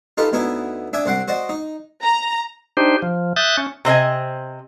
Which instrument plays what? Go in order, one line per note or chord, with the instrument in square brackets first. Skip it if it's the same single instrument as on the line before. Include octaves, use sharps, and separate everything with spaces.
[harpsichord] D#4 F4 G4 A4 B4
D2 B3 D#4 E4 G#5
D4 E5 G5 G#5 D6 D#6
C2 C4 F#5 C6 D6
F#4 C5 D5 D#5
D#4
[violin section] A#5
[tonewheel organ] D4 D#4 G4 C5
F3
E5 D#6 F#6 G6 A6
C#4
[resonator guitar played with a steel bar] C3 C4 D#5 G#5